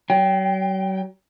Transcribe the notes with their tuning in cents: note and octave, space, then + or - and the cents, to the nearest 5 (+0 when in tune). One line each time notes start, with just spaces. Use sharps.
F#3 +40 G5 +0